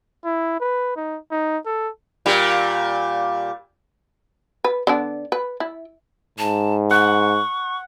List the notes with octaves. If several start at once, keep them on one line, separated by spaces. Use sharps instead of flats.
E4
B4
D#4
D#4
A4
A#2 G3
B4
D3 B3 D4
B4
E4
G#2 A5
F#5 C#6